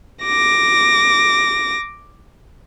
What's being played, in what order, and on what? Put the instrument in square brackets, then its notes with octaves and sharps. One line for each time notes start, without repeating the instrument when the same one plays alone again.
[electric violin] D6 A#6